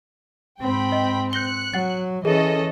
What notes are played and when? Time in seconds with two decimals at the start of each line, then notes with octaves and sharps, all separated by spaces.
0.60 G#2 C4 G5 B5
0.92 D#5
1.33 F#6 G6 A#6 C#7 G7
1.74 F#3 F#5 A6
2.25 E3 C#4 G#4 A4 D#5